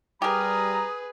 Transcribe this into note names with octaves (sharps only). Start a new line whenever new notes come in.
G3 G4 G#4 A#4 B4 A#5 D#6